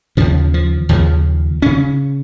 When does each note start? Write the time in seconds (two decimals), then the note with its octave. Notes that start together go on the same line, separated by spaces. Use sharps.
0.17 D#2 C#3 F3
0.54 F3
0.89 D#2 C#3 F3
1.62 C#3 C#4